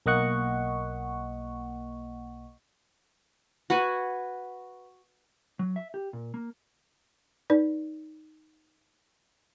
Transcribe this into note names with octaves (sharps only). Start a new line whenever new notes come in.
B1 A#3 D#5 F#5 C#6
F#4 B4 F#5 G#5
F#3
E5
G4
A#2
A#3
D#4 B4 D5